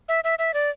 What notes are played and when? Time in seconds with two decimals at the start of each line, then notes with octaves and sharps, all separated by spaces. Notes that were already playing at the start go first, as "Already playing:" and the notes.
0.08 E5
0.24 E5
0.39 E5
0.54 D5